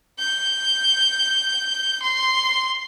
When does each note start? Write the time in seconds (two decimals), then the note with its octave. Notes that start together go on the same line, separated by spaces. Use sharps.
0.19 G6
2.02 C6